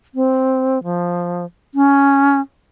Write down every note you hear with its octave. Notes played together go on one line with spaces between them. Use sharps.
C4
F3
C#4